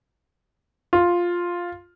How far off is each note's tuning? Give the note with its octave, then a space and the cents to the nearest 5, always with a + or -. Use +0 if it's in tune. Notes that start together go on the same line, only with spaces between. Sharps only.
F4 +5